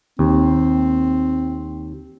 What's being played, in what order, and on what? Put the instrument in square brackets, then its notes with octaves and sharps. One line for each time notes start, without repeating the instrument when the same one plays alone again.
[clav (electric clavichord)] D#2 [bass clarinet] C4